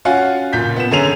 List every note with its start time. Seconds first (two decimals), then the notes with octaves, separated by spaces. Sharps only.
0.05 C#4 F4 F#4 F5 F#5 G#5
0.53 F#1 A#2 G6 B6
0.76 B3 E7
0.91 F#2 D3 C#4 G#4 D#7 F7